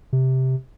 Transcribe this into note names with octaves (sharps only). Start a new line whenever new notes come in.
C3